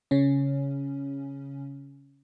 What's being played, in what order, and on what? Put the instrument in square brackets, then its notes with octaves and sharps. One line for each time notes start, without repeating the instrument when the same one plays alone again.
[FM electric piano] C#3 C#4